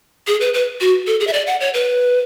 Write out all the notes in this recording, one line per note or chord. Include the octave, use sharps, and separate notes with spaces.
G#4
B4
B4
F#4
A4
G#4
E5
D5
F#5
C#5
B4